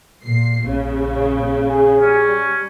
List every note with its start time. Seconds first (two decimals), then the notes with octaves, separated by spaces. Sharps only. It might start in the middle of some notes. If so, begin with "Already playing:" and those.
0.23 A#2 C7
0.61 A#1 C#3
1.70 G#4
2.01 G3 C#4